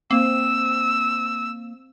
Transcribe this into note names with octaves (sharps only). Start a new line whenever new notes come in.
A#3 C4 E6